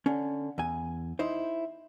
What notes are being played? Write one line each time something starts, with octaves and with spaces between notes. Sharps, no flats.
D3 C#4
E2 G#5
D#4 E4 C5